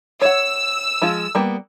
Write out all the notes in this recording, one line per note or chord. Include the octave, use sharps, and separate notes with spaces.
C#5 F#5 E6
F3 G#3 F4
G3 A#3 B3